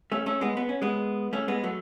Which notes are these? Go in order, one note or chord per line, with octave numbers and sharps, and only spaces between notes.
A3 C#4
A3 C#4
G#3 B3
B3
C#4
G#3 B3
A3 C#4
G#3 B3
F#3 A3